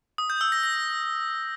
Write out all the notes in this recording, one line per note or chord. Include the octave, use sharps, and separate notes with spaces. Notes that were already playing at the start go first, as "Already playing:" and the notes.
D#6
G6
E6
A#6
A#6